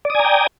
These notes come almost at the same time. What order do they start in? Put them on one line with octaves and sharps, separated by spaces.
D5 D#6 G#5 A#5 G5